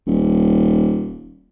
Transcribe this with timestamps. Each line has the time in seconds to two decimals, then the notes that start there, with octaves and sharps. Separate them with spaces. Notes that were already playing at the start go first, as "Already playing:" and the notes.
0.07 D#1